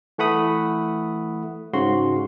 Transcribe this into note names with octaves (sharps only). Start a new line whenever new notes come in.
E3 A3 F#5 B5 D#6
G#2 C#3 F#4 C6